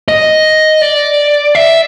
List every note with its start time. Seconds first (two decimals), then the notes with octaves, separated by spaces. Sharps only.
0.08 D#5
0.82 D5
1.55 E5